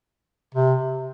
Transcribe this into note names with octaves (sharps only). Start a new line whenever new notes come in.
C3